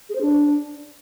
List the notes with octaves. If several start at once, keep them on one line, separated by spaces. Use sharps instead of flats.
G#4
C5
D4